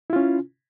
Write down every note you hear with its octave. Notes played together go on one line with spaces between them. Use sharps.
C#4 E4 F4